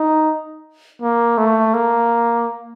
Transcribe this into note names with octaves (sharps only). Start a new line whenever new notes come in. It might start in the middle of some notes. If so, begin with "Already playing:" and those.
Already playing: D#4
A#3
A3
A#3